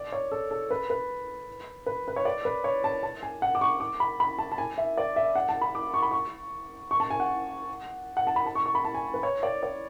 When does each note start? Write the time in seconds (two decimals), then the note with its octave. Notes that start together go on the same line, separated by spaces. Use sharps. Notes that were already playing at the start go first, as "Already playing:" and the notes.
Already playing: D5
0.12 C#5
0.32 A4
0.51 A4
0.71 B4
0.90 B4
1.86 B4
2.08 B4
2.16 C#5
2.25 D5
2.45 B4
2.64 C#5
2.84 A5
3.03 A5
3.23 G#5
3.42 F#5
3.55 D6
3.61 C#6
3.80 D6
4.00 B5
4.20 B5
4.39 A5
4.52 A5
4.58 G#5
4.78 E5
4.97 D5
5.16 E5
5.35 F#5
5.49 A5
5.61 B5
5.75 D6
5.94 C#6
6.03 B5
6.11 C#6
6.91 C#6
7.00 A5
7.10 G#5
7.20 F#5
8.17 F#5
8.27 A5
8.36 B5
8.46 A5
8.55 C#6
8.66 C#6
8.75 B5
8.85 A5
8.95 G#5
9.14 B4
9.23 C#5
9.43 D5
9.63 D5